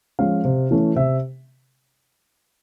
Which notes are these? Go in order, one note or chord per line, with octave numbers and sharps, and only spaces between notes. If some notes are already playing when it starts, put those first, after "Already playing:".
F3 G#3 C#4 F5
C3
E3 A3 C#4
C3 E5